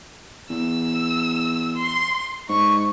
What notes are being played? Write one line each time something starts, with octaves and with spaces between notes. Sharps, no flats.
E2 E6
C6
G#2 C#6